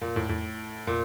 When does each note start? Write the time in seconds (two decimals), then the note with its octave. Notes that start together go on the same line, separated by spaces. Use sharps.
0.02 A#2
0.16 A2
0.29 A2
0.87 A#2